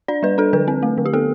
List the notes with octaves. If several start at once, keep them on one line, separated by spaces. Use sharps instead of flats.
D4 D5
G3 B4
D4 A4
D3 B4
C4
A3
D3
G4
B3 A4